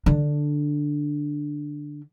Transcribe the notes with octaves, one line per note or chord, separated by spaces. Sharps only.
D3 D4